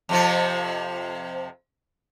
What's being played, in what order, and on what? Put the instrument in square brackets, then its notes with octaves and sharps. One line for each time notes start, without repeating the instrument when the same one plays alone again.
[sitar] F2 C3 F3